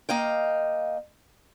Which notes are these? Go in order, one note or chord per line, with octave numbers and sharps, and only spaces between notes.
A#3 D#5 F5 G5